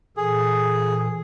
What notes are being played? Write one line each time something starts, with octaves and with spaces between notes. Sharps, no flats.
A#2 E3 G#4 A4